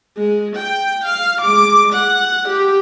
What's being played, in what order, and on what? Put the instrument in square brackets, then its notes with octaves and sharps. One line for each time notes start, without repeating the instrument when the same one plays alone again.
[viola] G#3
G5
F5
G#3 D6
F#5
G4